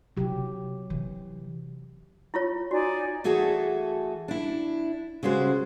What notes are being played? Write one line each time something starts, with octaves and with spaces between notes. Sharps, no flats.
C3 F#3 E4 G4
C4
C3 E3
E4 F4 C#5
D#4 F#4 D5 G#5
E3 A3 F#4 G#4 A4
D4 E4
C#3 G3 G#3 F#4 C5